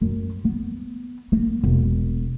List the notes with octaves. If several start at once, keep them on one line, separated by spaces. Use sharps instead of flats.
F#2
B3
A#3
E1